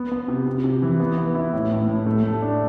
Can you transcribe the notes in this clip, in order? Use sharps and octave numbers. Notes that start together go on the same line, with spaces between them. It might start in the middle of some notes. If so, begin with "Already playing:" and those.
Already playing: B3
B3
C3
C3
C3
E3
B3
B3
E4
A2
A2
A2
A3
A3
D4